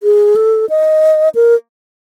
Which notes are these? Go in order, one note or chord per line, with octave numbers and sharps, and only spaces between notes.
G#4
A4
D#5
A#4